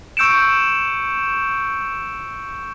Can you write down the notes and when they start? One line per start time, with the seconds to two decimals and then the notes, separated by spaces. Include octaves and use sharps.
0.17 C#6 E6 G6 C#7 D7 E7